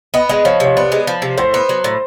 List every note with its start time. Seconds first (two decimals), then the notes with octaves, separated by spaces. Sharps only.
0.14 B3 D#5
0.29 G#3 D#5
0.45 F3 C#5
0.60 C3 C#5
0.76 B3 D5
0.92 G#3
1.07 F3
1.22 C3
1.38 A2 C5
1.54 B3
1.69 F#3
1.84 A2